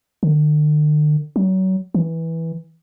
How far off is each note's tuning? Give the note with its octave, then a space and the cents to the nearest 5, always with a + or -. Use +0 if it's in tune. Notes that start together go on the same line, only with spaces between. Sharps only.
D3 +45
F#3 +30
E3 -10